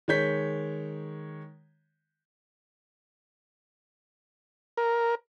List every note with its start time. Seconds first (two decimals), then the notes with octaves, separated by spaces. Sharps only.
0.08 D#3 G#3 C#5 G6 B6
4.77 A#4